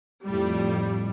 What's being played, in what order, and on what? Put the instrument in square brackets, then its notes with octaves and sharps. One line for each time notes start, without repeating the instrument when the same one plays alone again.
[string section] F2 A2 G3